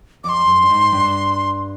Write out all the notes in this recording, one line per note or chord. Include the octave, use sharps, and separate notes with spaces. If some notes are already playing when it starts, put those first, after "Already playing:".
F2 C6 D6
F#2
G2
G#2
G2